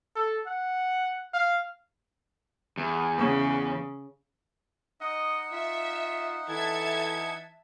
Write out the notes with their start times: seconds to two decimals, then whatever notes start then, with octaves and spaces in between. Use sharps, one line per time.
0.16 A4
0.47 F#5
1.34 F5
2.77 E2
3.18 C#3
5.01 D#4 D#5 F#5
5.52 F4 E5
6.48 E3 A4 E5 A5 G#6